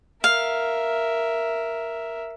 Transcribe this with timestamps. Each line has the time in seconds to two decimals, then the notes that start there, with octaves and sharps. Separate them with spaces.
0.24 A#4 E5 F5